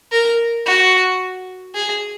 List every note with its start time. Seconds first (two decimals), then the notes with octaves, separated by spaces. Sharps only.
0.12 A#4
0.66 F#4
1.74 G#4